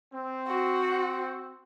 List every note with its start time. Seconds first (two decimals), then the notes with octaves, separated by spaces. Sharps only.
0.14 C4
0.47 F#4